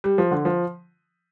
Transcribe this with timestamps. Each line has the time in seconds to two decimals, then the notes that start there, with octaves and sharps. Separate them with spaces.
0.04 G3
0.18 F3
0.31 D3
0.45 F3